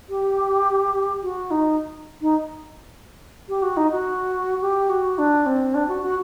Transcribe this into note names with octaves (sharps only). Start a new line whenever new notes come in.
G4
F#4
D#4
D#4
G4
F#4
D#4
F#4
G4
F#4
D4
C4
D4
F#4
F#4